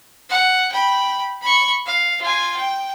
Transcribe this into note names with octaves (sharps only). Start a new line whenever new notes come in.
F#5
G5 B5
B5 C#6
F5
F4 G#5
G5